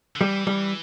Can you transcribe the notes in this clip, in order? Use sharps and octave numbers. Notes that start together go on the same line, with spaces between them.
D3
E3 G3
G3